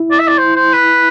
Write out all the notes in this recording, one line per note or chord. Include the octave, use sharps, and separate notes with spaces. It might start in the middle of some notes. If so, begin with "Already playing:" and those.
Already playing: E4
D5
E5
D5
C5
C5
B4